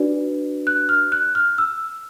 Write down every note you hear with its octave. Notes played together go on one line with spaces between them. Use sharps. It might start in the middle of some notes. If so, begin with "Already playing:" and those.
Already playing: D4 F#4 B4 D5
F#6
F6
F#6
F6
E6